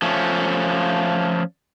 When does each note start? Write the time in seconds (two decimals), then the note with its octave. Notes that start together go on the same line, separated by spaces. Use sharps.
0.02 F3 A3 C#4